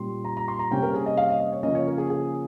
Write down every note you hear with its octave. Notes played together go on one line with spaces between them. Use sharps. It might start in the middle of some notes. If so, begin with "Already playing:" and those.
Already playing: A#2 G3 C#4 C6
A#5
A#5
C6
A#5
C3 G3 A#3 C#4 G5
A#4
G#4
D#5
F5
D#5
D#5
C#5
C#3 F3 A#3 C#4 D#5
C#5
A#4
G#4
G#4